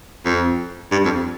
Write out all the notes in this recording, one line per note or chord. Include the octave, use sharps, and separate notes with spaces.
F2
G2
F2